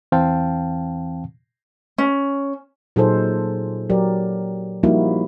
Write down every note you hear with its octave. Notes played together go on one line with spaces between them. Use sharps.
E2 E3 C4 F5 G5 A5
C#4
A#2 F#3 D#4 G#4 A4 C5
F#3 G4 A#4 D5
F3 G3 A#3 D#4 E4 F#4